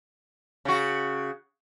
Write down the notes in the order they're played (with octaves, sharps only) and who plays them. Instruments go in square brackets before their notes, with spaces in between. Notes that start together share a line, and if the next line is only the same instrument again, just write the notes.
[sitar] C#3 F#4